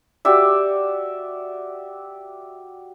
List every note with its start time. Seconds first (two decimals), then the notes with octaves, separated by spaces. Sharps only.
0.25 F#4 G4 D5 E5